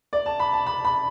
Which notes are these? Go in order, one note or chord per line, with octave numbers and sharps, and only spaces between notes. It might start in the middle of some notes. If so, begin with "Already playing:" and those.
D5
A5
B5
A5
B5
B5